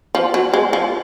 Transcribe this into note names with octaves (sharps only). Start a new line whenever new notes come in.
F3
F#3
G#3
F3